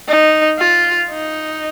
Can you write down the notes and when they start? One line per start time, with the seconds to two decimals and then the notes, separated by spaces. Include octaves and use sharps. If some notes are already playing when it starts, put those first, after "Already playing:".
0.08 D#4
0.58 F4
1.10 D#4